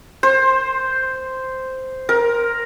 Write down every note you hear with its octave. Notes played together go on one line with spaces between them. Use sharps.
C5
A#4